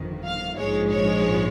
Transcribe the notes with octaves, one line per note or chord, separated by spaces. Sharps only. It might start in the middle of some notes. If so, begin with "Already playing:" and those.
Already playing: G1 F2 D#3
F5
A#1 G#2 F3 G#3 C#5
C#5